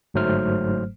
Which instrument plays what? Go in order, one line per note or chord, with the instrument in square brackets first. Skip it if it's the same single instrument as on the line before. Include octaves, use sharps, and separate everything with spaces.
[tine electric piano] G1 G#2 F#3 A3 C5 F6